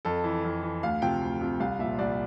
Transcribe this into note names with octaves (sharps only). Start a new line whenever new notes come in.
F2 A4
E3
F2
E3
D2 F5
C3 F3 G5
D2
C3 F3
C2 F5
A#2 F3 E5
C2 D5